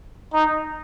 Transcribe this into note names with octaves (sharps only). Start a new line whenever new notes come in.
D#4